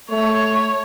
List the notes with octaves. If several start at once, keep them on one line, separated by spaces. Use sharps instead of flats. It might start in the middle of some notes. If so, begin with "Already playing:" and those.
A3 C#5